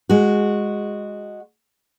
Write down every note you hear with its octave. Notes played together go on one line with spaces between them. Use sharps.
G#3 F#4